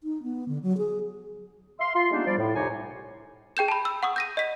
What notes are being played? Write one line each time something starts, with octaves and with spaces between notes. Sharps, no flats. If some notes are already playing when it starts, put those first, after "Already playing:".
D#4
B3
D3
F#3
G#4
E5 F5 C6
F4 C6
G3 G#3 A#3 B3 D4 D#4
F3 G3 D5
A2
C2 F2 C3 D#4 C#5 G#5
G#4 G5 G6 E7
A5 B5
E6
F#5 C#6 D#6
G6 A#6 D#7
D#5 B6